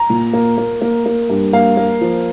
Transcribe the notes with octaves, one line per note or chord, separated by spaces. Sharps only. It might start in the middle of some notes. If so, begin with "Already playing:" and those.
Already playing: A#5
A#2
A#3
A#3
A#3
A#3
G2
A#3 F5
A#3
F3